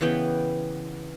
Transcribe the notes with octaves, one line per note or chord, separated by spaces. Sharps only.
C#3 E3 B3 G5